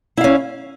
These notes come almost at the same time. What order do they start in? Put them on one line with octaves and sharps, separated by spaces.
E4 F5 C#4